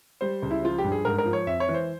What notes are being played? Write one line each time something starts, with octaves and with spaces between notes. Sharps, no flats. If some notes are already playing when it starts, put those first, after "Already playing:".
G3 C5
C#2
E4
F3 F4
G4
G2
G#4
G#2 A#4
A#4
F3
C#5
F2 E5
C#5
E3
C5